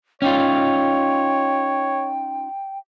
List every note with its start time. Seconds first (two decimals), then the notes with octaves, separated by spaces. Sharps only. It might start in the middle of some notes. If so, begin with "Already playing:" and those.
0.22 C#4 D#4 F4 C#5 G5